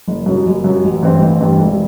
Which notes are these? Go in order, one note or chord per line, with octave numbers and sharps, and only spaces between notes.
F#1
F#2 F#3
F#1
F#2 F#3
A1
G2 E3 G3 C4
A1
G2 E3 G3 C4
E1